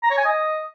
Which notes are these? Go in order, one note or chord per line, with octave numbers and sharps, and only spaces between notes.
A#5
C#5
G#5
D#5